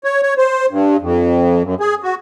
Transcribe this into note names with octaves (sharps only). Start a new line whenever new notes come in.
C#5
C#5
C5
G2
F2
F#2
G#4
F#4